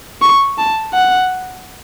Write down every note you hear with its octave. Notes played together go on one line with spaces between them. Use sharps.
C#6
A5
F#5